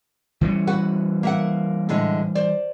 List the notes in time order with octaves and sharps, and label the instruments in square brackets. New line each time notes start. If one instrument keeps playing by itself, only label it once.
[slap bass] E3 G3 C#4
[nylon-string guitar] F#4 B4 F#5
A#3 E5 F#5
A2 D3 G#3
C5 D5